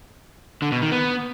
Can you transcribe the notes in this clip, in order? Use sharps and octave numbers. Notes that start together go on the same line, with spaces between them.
D3
B2
D#3
B3